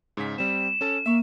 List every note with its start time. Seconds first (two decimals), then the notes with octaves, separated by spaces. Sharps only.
0.17 G#2 C#3 B6
0.38 G3 C4 E7
0.81 C#4 A4 A5
1.06 A#3 E5 C#6